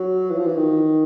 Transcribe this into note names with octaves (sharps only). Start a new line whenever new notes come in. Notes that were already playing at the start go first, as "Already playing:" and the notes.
Already playing: F#3
E3
F3
E3
D#3